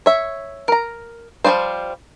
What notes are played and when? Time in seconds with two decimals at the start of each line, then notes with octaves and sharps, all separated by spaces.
0.06 C#5 E5
0.68 A#4 A#5
1.45 F3 G3 C4 F4 C5